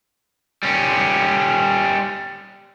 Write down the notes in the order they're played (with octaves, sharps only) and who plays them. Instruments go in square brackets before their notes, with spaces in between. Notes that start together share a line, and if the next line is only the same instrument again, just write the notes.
[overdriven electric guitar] G3 C#4